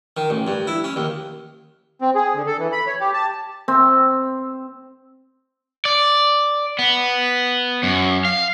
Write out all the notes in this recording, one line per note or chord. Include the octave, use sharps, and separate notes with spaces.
D#3
A1
G2
E4
C#4
D#2
C4
G#4
D3
A4
E3
B5
C#5
G4
A5
C4
D5
B3
F#2
F5